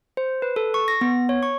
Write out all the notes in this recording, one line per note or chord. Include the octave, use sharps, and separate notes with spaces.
C5
B4
A4
C#6
A#6
B3
C#5
C#6